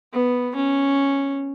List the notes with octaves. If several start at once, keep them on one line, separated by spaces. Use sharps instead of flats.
B3
C#4